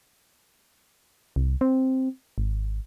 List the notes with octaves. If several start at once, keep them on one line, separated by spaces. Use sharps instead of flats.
C2
C4
G#1